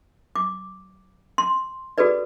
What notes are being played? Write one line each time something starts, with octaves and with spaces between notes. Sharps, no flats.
D6
C6
F#4 G#4 A4 B4 D5